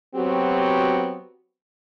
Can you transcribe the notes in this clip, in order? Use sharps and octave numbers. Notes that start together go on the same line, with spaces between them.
F#3 B3 C4 F#4 G4